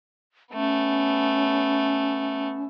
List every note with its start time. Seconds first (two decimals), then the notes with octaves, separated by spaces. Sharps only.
0.54 A3 B3 C#4